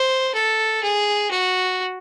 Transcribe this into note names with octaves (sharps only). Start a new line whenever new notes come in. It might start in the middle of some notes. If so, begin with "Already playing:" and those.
Already playing: C5
A4
G#4
F#4